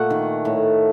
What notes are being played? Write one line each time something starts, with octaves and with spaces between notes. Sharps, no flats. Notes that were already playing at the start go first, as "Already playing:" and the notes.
Already playing: A#2 A3 F#5
D#3
A2